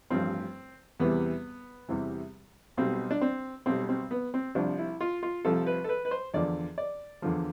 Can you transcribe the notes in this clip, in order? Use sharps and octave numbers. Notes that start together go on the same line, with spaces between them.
A1 G2 F3 C4
E2 C3 E3 G3 B3
E2 C3 E3 G3
B1 B2 G3 C4
D4
C4
B1 B2 G3 C4
C4
B3
C4
C2 C3 F3 D4
E4
F4
F4
C2 C3 F3 A4
B4
A4
B4
B4
C5
E2 D3 F3 D5
D5
E2 D3 F3